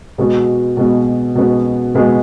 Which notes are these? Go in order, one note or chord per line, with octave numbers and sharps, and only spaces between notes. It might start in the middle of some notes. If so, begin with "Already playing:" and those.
B2 G#3 B3 F#4
B2 G#3 B3 F#4
B2 G#3 B3 F#4
B2 G#3 B3 F#4